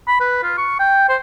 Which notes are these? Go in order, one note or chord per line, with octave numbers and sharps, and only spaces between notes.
B5
B4
F4
C#6
G5
C5